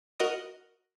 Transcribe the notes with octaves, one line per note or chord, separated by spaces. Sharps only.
F#4 A#4 D#5 A#5 D#6